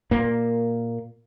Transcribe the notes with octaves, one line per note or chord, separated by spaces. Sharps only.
A#2 A#3